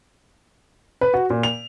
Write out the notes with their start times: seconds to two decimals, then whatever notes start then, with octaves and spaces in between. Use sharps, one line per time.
1.01 B4
1.14 F#4
1.30 A#2
1.43 F7